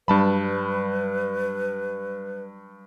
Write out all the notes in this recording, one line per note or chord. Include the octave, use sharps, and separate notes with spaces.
G2 F#3 G3 B4 A5 B5